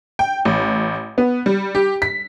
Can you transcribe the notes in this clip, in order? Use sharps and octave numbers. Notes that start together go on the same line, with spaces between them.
G5
A1
B3
G3
G4
B6